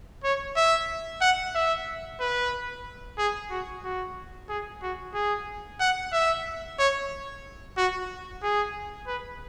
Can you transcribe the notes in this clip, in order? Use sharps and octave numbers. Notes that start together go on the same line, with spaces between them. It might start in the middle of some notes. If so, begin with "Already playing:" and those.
C#5
E5
F#5
E5
B4
G#4
F#4
F#4
G#4
F#4
G#4
F#5
E5
C#5
F#4
G#4
B4